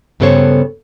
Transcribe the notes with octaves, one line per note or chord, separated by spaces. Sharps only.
G2 C#3 B3 A4 C5 C#5